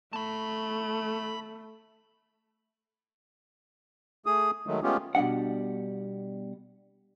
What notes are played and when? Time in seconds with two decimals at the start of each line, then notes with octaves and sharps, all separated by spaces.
0.13 A3 A5 B5
4.26 A3 G#4 D#6
4.67 D#3 F#3 G#3 A3
4.83 G#3 A3 B3 C#4 F4 G4
5.15 B2 G3 D4 F#5